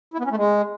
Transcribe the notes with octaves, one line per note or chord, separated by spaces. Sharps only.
E4
B3
C#4
A3
G#3